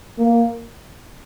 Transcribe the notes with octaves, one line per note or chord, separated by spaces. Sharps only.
A#3